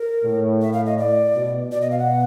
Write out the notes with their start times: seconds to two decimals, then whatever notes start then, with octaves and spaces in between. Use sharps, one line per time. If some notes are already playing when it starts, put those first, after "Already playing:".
Already playing: A#4
0.24 A2
0.62 E5
0.73 F5
0.86 D#5
0.98 D5
1.34 B2
1.72 B2 D5
1.81 D#5
1.91 F5
1.99 F#5